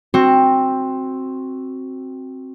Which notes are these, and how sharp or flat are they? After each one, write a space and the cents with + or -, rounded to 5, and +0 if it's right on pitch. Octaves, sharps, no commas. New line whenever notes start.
C4 +10 F#4 +0